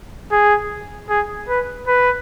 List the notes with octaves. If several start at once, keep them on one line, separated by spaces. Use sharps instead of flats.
G#4
G#4
B4
B4